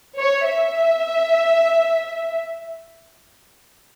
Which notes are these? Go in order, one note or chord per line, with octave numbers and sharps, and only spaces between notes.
C#5
E5